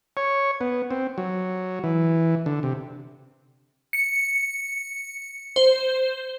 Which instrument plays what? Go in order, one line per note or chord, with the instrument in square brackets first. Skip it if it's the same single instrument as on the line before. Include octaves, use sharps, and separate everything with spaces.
[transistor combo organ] C#5
B3
C4
F#3
E3
D3
C3
[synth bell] C#7
C5